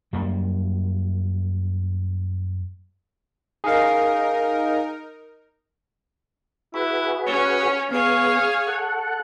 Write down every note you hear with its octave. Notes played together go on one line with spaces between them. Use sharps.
F#2 G3 A#3
D#4 G#4 A#4 F5
E4 F#4 G#4 B4
C#4 C#5
B3 G#4 C#5 F5
A4 F#5